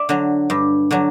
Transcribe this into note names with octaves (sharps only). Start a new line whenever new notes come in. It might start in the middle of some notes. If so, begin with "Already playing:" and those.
Already playing: D5 E5
D3 F#3
G2
D3 F#3